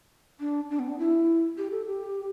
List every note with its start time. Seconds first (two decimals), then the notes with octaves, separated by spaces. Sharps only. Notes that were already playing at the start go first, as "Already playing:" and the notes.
0.40 D4
0.70 D4
0.79 B3
0.89 D4
0.99 E4
1.57 G4
1.71 A4
1.86 G4